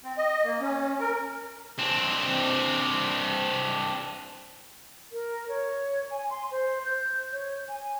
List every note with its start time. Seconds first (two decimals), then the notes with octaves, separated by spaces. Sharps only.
0.04 C4
0.17 D#5
0.44 A#3
0.61 C#4
0.99 A#4
1.79 C4 D4
5.12 A#4
5.49 C#5
6.11 G#5
6.30 C6
6.51 C5
6.85 G6
7.32 C#5
7.68 G#5